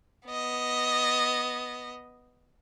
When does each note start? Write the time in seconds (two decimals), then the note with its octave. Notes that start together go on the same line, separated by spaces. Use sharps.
0.28 B3 D#5